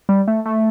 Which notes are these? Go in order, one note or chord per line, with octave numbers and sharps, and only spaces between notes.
G3
A3
A3